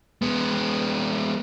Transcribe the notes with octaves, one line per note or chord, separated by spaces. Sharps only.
G#3 B3